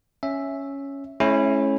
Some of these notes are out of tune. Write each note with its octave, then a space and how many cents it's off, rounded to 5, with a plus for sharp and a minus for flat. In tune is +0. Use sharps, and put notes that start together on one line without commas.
C#4 +0 E5 +0
A3 -45 C#4 -15 E4 +0